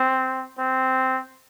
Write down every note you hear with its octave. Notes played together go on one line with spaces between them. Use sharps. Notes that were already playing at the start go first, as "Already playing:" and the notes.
Already playing: C4
C4